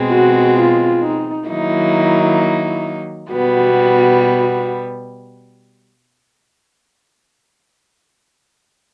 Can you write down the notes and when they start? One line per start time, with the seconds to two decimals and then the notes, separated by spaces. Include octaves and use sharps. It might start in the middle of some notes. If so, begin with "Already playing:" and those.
Already playing: B2 G#3 C4
0.11 F#4
0.57 F4
1.03 D#4
1.48 D#3 F#3 A#3 D#4 E4
3.32 B2 G3 B3 F#4